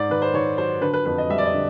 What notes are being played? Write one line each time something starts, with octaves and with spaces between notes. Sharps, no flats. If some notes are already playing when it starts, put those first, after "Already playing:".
Already playing: G#2 D5
D#3 B4
C5
D#3 C#5
F#3 C5
D3 B4
B4
F2 B4
D#5
G3 E5
D5
D#5
D3